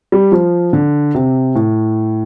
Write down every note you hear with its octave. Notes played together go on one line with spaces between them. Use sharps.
G3
F3
D3
C3
A2